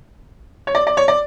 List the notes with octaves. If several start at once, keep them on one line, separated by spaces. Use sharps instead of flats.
C#5
D5
D5
C#5
D5